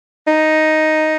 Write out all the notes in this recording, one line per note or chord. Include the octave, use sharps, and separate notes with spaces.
D#4